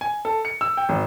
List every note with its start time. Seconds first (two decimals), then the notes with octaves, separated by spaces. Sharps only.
0.01 G#5
0.25 A4
0.45 C#7
0.61 E6
0.77 G5
0.89 G#1